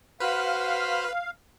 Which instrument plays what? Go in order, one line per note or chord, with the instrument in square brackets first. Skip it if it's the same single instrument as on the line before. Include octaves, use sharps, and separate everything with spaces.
[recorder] F#4 [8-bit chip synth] B4 [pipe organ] C5 B5 F6 [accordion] F5